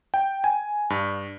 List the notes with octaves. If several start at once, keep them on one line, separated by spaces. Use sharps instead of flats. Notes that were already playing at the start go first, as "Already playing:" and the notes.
G5
G#5
G2